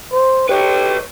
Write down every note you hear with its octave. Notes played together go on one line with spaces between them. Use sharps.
C5
G4 B4 C#5